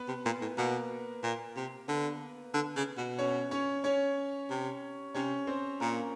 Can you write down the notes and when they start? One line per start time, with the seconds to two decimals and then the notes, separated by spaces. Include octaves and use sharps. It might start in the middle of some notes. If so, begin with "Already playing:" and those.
Already playing: B3 B4
0.08 C3
0.25 A#2
0.41 A2
0.57 B2 A#3 A#4
1.23 A#2
1.56 C3
1.88 D3 B3 B4
2.54 D3
2.76 C#3
2.97 B2
3.18 C#4 C#5
3.51 C#4 C#5
3.84 C#4 C#5
4.50 C3
5.14 C3 C#4 C#5
5.47 C4 C5
5.80 A#2 A#3 A#4